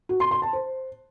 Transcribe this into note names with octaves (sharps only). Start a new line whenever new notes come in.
F#4
C6
C6
A5
C5